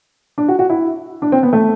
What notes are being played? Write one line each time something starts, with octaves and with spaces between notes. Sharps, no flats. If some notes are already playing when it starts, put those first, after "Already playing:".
D4
F#4
F#4
E4
D4
C4
B3
A3